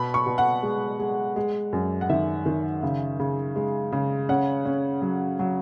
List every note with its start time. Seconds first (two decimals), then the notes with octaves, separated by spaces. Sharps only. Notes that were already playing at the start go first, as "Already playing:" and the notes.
Already playing: B2 B5
0.14 C#6
0.26 B2
0.38 F#5
0.63 G#3
1.00 G#3
1.36 G#3
1.73 F#2
2.01 F#5
2.09 D#3 E5
2.46 D#3
2.83 C#3
3.19 C#3
3.56 G#3
3.92 C#3
4.29 C#4 F#5
4.65 C#4
5.02 F#3
5.39 F#3